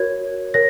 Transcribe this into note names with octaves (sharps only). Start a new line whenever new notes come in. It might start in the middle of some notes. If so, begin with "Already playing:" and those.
Already playing: F#4 A#4 C#5 G#6
A#4 C#5 A#6